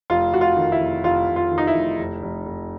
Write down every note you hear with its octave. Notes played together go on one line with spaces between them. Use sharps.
F1 F4
F1 F#4
F4
D#3
E4
F1
F1 F4
F1
F4
D#3
D#4
E4
F1
F1
F1
F1